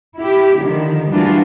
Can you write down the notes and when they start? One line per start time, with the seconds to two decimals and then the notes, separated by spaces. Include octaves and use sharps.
0.17 E4 G4
0.59 D3 D#3 F3
1.11 E3 G3 A#3 D4 F4 F#4